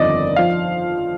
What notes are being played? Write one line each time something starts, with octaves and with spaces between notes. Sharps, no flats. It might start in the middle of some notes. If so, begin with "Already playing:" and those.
Already playing: G1 F2 D#3 D5 D#5
F3 F5